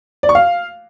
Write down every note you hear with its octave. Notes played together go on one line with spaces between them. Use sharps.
D5
C#6
F5